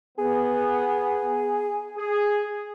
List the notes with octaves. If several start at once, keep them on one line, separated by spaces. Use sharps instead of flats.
B3 G#4
G#4